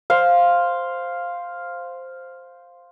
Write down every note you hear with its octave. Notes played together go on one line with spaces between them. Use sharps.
C5 F5